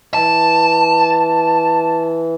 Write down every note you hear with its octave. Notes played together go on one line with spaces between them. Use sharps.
E3 A5